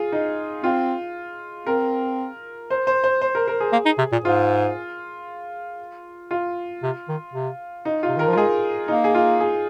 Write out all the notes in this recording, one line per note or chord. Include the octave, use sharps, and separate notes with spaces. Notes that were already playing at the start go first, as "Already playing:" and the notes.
Already playing: F4 G#4
D#4
C4 F4
C4 A#4
C5
C5
C5
C5
A#4
A#4
G#4
A#3
D#4
C3
A#2
G#2 F4
F4
C3
D#3
C3
D#4
F4
C3
D#3 A#4
F3
F4
G#3 G#4
A#3 D#4
G#4
F4
G#4